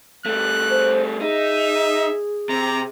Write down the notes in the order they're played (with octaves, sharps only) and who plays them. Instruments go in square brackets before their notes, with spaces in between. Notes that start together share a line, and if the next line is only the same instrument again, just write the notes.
[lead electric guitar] G3 A3 [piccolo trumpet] F#6
[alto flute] C5
[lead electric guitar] D#4 [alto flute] G#4 [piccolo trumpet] E5
[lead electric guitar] C3 [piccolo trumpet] A#5